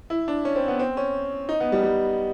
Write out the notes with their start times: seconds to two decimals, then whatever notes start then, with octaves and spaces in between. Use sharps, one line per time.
0.10 E4
0.28 D4
0.45 C#4
0.56 C4
0.68 B3
0.80 C4
0.97 C#4
1.49 D#4
1.60 B3
1.72 G3
1.83 G3